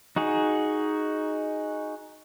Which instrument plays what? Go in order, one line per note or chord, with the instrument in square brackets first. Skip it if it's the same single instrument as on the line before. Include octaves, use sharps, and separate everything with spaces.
[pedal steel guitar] D#4 F#4 G#4